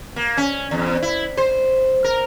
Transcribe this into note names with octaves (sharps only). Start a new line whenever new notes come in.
A#3
C#4
E2
E4
C5
A#4